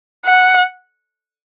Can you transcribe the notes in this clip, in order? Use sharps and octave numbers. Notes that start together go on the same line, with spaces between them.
F#5